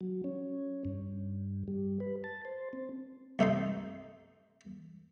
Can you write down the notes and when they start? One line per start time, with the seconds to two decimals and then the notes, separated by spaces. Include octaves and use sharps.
0.01 F#3
0.24 C#4
0.85 G2
1.68 G3
2.00 B4
2.24 A5
2.45 C5
2.73 C4
3.39 C2 A3 D#4 C6